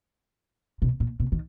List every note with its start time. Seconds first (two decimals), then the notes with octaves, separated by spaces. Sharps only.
0.82 B2
1.00 A#2
1.20 B2
1.32 D#3